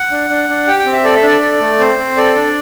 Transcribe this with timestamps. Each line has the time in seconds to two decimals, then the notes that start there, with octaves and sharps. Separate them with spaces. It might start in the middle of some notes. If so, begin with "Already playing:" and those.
Already playing: F#5
0.11 D4
0.30 D4
0.49 D4
0.67 G4 G5
0.79 G5
0.86 C4
0.92 E5
1.04 A4 D5
1.15 E5
1.23 D4 D5
1.41 A4
1.60 A3
1.79 C4 C5
1.98 C4
2.17 A4 D5
2.36 D4